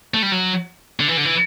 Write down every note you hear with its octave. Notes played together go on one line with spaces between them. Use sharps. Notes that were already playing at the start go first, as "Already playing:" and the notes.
A3
G3
F#3
D3
E3
D3
E3